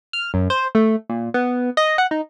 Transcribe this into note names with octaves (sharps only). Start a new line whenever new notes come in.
F6
F#2
C5
A3
A#2
B3
D#5
F#5
D#4